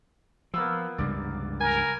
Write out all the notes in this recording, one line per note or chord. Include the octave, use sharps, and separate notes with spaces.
F3 A#3 B3 E6
C#2 G2 C3 D5
A#4 G#5